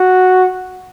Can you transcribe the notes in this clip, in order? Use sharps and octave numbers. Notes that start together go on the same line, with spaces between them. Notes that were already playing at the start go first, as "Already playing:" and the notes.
Already playing: F#4